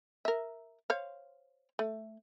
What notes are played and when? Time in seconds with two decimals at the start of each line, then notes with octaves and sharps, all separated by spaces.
0.25 A#4 E5
0.90 C5 C#5 F5
1.79 A3